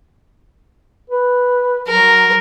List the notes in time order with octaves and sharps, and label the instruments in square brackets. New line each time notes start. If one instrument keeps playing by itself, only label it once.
[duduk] B4
[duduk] F#3 [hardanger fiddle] A#4